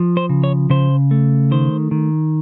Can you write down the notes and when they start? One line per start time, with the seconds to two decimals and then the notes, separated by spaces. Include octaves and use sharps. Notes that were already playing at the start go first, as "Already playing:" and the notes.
Already playing: F3
0.17 C5
0.29 C#3
0.44 C#5
0.70 C#3 C5
1.11 A3
1.51 D#3 C5
1.91 D#3